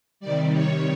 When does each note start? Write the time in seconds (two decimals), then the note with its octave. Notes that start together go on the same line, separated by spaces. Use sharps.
0.20 C3 D#3 G3 D5
0.52 C#5